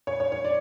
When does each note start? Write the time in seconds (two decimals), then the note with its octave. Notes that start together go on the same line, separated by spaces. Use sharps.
0.07 C#5
0.20 C#5
0.32 C#5
0.45 D5